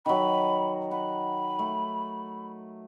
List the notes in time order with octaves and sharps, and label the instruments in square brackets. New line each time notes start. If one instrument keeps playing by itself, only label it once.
[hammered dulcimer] D#3 F#3 [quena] B5
[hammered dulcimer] F#5 [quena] B5
[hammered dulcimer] A3